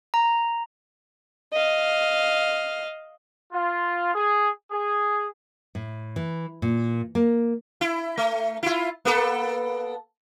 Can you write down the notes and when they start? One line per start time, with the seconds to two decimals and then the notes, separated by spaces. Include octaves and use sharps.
0.14 A#5
1.53 D#5 F5
3.53 F4
4.14 G#4
4.71 G#4
5.75 A2
6.16 E3
6.62 A#2
7.15 A#3
7.81 E4
8.17 A3
8.63 E4 F4
9.05 A#3 B3 A4